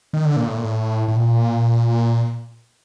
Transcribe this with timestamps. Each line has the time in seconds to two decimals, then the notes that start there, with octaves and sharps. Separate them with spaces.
0.13 D#3
0.25 D3
0.36 A#2
0.47 A2
0.57 A#2
0.64 A2
1.08 A2
1.16 A#2